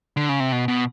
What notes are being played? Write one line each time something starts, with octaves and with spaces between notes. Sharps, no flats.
D3
C#3
C3
B2
B2